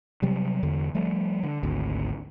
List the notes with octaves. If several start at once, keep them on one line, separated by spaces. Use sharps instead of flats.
C3 F#3 G3
E2 D3
F3 G3 A3
D3
G#1 D2